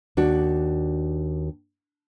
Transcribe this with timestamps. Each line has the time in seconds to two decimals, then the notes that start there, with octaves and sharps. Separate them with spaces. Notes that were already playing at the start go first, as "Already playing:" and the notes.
0.17 D#2 D4 F#4